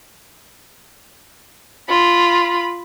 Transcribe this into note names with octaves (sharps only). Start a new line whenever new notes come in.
F4 B5